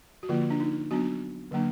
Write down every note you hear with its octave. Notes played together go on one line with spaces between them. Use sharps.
F#4
D3 F3 A#3 F4
D4
D#4
F#3 B3 D4 F#4
D3 F#3 A#3 D4